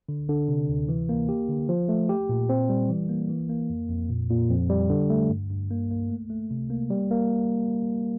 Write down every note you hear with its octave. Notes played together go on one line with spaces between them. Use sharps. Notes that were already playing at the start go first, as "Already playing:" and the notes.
D3
D3
C3
D2
E3
A#3
G4
D3
F3
A3
G4
A#2
C4
G3
E3
A#3
E3
A#3
F2
F2
A#2
A#2
F2
G3
D3
A3
G2
G2
A#3
A#3
A3
A3
C3
A#3
G3
A#3